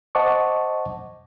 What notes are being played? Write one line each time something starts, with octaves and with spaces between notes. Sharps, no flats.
C5 D#5 F#5 A5 C#6 D6